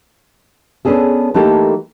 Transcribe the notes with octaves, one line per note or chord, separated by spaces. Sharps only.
B3 C#4 D4 G#4 A4
E3 A3 A#3 D#4 G4 A4